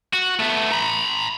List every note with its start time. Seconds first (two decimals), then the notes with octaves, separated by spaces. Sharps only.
0.13 F#4
0.40 A3 B3
0.72 A#5 B5